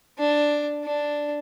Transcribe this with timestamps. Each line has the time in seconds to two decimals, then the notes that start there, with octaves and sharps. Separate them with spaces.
0.19 D4
0.84 D4